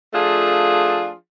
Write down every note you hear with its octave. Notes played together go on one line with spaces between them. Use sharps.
F3 A3 D4 F4 G#4